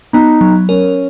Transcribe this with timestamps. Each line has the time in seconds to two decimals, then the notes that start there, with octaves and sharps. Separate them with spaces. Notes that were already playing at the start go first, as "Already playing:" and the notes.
0.13 B3 D#4
0.41 F#3
0.69 C#4 A#4